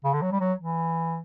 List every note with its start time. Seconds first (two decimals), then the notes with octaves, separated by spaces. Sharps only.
0.04 C#3
0.13 D3
0.22 F#3
0.31 G3
0.40 F#3
0.58 E3